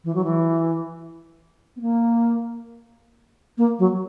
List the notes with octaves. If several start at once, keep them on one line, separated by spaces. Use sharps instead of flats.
E3
F#3
E3
B3
A#3
A#3
F#3